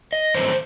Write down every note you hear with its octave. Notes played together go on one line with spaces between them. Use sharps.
D#5
G2 D#3 F#3 A3 C4 C5